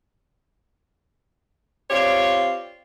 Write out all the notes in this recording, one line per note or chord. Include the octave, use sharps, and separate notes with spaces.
C4 F4 G4 C#5 D5